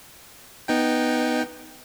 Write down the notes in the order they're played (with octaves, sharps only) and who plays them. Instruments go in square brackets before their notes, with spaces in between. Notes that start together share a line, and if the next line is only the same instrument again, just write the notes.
[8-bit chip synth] B3 D#4 G5